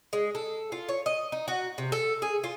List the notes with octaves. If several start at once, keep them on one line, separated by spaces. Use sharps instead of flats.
G#3
A4
F4
C#5
D#5
D#4
F#4
C3
A4
G#4
F4